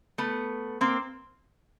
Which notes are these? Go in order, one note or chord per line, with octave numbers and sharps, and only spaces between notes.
A3 B3
A#3 C4